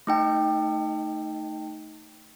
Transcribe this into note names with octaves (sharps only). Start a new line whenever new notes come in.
A3 D#4 G5